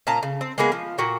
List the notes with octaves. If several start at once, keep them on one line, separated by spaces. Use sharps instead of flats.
A#2 C#4 A5 A#5
C#3
C4
G#3 A#3 B3 G#4
F3
A#2 F#4 G5